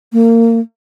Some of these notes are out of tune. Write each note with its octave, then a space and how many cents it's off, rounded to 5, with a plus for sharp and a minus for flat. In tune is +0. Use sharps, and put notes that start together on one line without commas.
A#3 -25